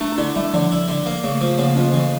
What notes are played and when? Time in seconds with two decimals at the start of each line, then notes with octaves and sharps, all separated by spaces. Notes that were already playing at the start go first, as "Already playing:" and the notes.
0.01 A3 D4
0.12 D4
0.18 D3 E4
0.35 G3 A3
0.54 D3 F3
0.72 E4
0.88 D3
1.06 A#3
1.24 C#3 A3
1.41 F3 A3
1.58 C#3 A#3
1.76 F2 C#4
1.93 C#3 E3